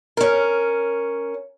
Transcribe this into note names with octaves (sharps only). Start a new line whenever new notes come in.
C#4 A#4